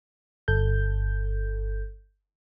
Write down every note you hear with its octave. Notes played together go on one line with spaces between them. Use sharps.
G1 A4 G6